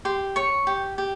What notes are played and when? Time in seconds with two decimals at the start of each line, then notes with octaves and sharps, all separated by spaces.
0.05 G4 C6
0.36 C#5 C#6
0.67 G4
0.98 G4